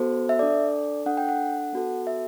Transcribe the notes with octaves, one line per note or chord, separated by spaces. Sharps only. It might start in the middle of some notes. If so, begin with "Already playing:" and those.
Already playing: B3 F#4 A4 C5
E5
D4 A4 D5
D4 A4 F#5
G5
F#5
B3 F#4 A4
E5